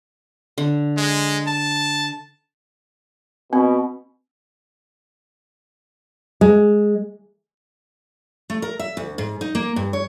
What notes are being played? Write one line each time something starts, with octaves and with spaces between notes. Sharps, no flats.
D3
G#3
A5
B2 C4
G#3
A3
A#4
E5
D2
G#2
D#4
A#3
G2
C#5